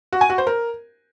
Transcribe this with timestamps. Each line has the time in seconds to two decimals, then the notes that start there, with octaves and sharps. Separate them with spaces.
0.12 F#4
0.21 G#5
0.30 F#4
0.38 C5
0.47 A#4